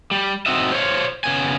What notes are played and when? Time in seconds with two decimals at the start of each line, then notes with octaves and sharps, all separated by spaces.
0.11 G3
0.46 C4 D#4 F#4 D#5 E5
0.72 C5 C#5 F5
1.24 C#3 B3 G#5